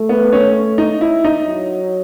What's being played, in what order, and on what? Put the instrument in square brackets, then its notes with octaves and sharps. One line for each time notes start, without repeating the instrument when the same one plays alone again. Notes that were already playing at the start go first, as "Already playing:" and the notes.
Already playing: [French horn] A3
[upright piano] B3
C#4
D#4
E4
D#4
[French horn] F#3